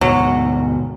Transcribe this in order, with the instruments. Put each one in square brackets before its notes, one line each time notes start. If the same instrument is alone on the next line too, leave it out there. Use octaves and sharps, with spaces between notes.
[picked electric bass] D2 G#2 B2 [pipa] F#3